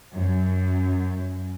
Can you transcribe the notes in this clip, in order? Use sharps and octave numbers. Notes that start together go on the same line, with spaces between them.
F#2